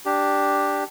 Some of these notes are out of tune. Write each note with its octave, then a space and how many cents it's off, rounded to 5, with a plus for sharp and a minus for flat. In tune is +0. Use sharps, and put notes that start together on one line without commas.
D4 +0 G4 +0